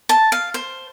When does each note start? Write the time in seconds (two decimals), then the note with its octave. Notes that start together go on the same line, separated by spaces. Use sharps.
0.09 A5
0.32 F5
0.54 C5